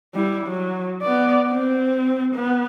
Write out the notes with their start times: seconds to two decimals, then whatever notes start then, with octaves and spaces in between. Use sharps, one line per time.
0.14 G3 E4
0.46 F#3
1.02 B3 D5
1.50 C4
2.35 B3